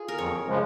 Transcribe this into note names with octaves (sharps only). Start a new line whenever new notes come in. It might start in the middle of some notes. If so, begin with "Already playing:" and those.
Already playing: F4 G#4
A#4
F2 C#5
C#3 F3 G#3